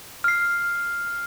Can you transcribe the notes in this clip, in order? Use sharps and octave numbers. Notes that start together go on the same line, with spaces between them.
F6 C7